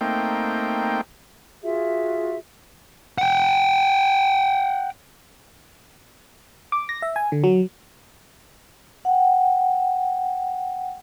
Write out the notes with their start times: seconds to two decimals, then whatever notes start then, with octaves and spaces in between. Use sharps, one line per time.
0.01 A3 A#3 C4 D#4 G5
1.62 F4 F#4 G#4 E5
3.18 F#5 G5
6.72 D6
6.89 A#6
7.02 E5
7.16 G#5
7.32 D3
7.44 F#3
9.05 F#5 G5